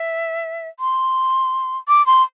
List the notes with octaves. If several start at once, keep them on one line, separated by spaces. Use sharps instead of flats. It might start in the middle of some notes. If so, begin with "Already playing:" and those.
Already playing: E5
C6
D6
C6